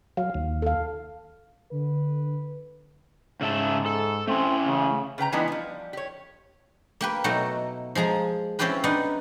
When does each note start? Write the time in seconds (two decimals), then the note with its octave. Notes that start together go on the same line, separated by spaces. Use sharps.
0.17 F#3 F5
0.34 D#2
0.62 A4 F5
1.71 D3 B4
3.41 G#2 C#3 E5 A5
3.86 A4
4.27 A3 C4 C#4
4.67 C#3
5.18 C#3 B4 G5 A#5
5.32 E3 G3 G#3 B3 D4 D#4
5.48 F3 G3
5.93 G4 C#5
7.01 A#3 G4 B4
7.24 B2 F#3 A3 D#4 F#4
7.95 F3 G#3 G#4 A#5
8.59 C4 C#4 E4 F4 G4 B4
8.84 B3 D4 D#4 B4 F#5